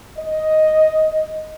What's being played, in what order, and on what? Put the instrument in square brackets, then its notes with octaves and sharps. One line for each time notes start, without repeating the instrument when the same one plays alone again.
[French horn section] D#5